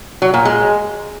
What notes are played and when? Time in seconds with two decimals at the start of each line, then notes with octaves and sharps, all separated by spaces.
0.22 F#3
0.34 A#2
0.45 G#3